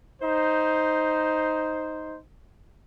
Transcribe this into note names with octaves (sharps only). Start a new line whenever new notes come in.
D#4 C5